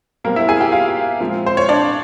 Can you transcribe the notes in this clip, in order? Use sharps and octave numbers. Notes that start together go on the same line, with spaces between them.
B2 G3 A#3 C4 A#4
E4 E5
G#4 G#5
G4 G5
F4 F5
A#2 F3 G#3 C4
C5
C#5
D4 D5